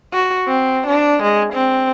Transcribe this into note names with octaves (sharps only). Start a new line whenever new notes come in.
F#4
C4
D4
G#3
C4